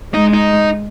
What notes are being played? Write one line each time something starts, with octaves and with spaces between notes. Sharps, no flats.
G#3 D#4
D#4